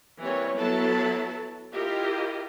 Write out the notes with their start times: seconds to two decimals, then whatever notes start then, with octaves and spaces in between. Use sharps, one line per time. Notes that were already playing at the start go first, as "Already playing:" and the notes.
0.21 E3 G3 A#3 C4 C#5
0.55 F#3 B3 E4 A4 A5
1.72 E4 F4 G4 A#4 D#5